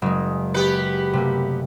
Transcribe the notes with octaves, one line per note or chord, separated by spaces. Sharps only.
F#1 G#3
B3 G4 B4 C#7
C3 A3 A#3